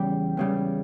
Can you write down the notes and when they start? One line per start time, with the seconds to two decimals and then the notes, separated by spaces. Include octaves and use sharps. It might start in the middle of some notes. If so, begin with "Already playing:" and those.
Already playing: E2 C#3 G3 G4
0.37 E2 C#3 G3